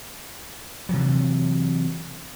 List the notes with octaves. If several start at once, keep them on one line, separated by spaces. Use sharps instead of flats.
C3 E3 F#3